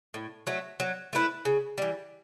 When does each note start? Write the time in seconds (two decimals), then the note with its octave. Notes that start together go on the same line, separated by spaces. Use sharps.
0.14 A2
0.47 F#3 A3
0.80 F#3
1.13 A3 E4 B4
1.45 C#3
1.78 E3 G3